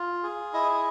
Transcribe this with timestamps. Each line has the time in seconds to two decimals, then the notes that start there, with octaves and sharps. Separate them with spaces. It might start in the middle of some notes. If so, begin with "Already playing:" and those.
Already playing: F4
0.23 G#4
0.53 E4 D#5